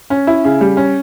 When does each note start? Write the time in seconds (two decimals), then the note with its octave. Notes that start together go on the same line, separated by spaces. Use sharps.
0.10 C#4
0.27 E4
0.44 C#3
0.61 G3
0.77 C#4